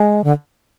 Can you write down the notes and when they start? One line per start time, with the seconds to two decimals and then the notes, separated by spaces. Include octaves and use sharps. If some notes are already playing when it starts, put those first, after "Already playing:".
Already playing: G#3
0.24 D3